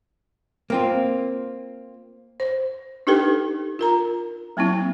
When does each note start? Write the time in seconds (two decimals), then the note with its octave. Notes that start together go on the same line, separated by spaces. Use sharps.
0.70 A#3 C4 F4
2.40 C5
3.07 D4 D#4 G4 A4 B4 G5
3.79 F4 A#4 A#5
4.57 F#3 A#3 C4 E4